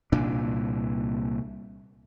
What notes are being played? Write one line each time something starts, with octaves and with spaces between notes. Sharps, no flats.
C2 A#2 E3 D4